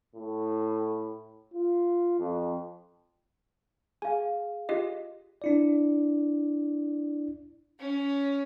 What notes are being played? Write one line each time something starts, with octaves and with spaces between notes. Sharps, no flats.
A2
F4
F2
G#4 F5 G#5
F4 G4 D#5
D4 E4 D5
C#4